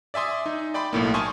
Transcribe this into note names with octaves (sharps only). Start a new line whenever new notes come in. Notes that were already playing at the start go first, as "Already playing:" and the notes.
D5 E5 G#5 C6 D#6
D#4
D5 G5 B5 C6 D6
B1 A2 A#3
G#5 A5 C6 C#6 D#6 F6